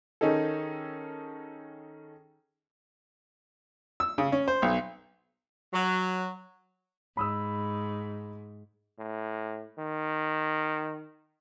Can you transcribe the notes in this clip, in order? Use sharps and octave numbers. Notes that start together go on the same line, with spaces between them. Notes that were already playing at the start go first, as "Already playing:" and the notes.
D#3 C#4 D#4 G#4 A4
E6
C#3
C#4
C5
B1
F#3
G#2 B5 D#6 E6
A2
D#3